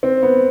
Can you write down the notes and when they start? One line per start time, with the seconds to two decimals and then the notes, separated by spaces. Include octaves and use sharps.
0.03 C4
0.23 B3